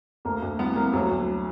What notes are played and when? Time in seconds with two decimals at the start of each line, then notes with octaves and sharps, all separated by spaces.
0.25 D2 A#3
0.42 D2
0.59 C2 B3
0.76 C2 A#3
0.93 D2 F#3
1.11 D2